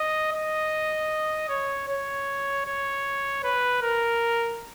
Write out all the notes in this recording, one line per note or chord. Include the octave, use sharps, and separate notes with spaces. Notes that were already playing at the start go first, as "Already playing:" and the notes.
Already playing: D#5
D#5
C#5
C#5
C#5
B4
A#4